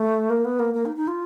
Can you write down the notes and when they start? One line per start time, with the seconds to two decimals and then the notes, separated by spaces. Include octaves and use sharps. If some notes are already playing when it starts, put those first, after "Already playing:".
Already playing: A3
0.30 A#3
0.45 B3
0.59 A#3
0.74 A#3
0.86 D#4
0.96 D#4
1.08 F4